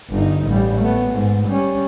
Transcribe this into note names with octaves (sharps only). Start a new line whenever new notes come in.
G1 D#4
A1 G3
A3 B3
G#2
G3 C#4